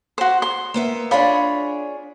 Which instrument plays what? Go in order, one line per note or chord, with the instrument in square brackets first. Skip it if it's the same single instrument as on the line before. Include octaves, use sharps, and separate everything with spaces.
[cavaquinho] F#4 C5
C6
[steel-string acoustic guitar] A#3 B3 E5
[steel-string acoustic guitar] D4 G#4 C#5 [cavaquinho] F4 B5